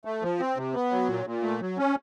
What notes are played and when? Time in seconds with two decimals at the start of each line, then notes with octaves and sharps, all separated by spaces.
0.05 A3
0.23 F3
0.40 C4
0.57 C3
0.74 B3
0.91 F#3
1.09 A#2
1.26 A#2
1.43 A3
1.61 F#3
1.78 C#4